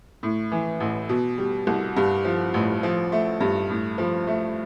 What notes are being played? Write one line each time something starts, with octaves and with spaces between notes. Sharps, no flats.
A2
E3
A1
B2
G3
C2
G2
F3
A1
F3
A3
G2
A2
F3
A3